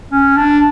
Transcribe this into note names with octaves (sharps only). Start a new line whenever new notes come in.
C#4
D4